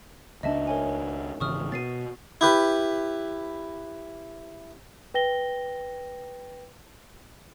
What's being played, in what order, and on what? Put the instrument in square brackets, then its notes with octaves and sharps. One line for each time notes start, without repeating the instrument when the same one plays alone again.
[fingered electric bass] C#2 G3 D4 [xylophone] D#5 E5 A5
[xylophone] A#4 C#5 G#5
[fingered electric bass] G#1 C#3 E3 [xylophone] C#6 D#6 F6
[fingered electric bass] B2 [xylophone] A6 C7 D#7
[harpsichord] E4 G4 B4
[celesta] B4 G5 A#6 G7